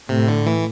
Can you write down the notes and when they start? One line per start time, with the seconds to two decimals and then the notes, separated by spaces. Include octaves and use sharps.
0.09 A2 C3
0.28 D3
0.46 E3